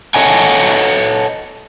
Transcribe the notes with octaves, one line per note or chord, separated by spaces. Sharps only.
A4 C#5 D#5 F#5 G#5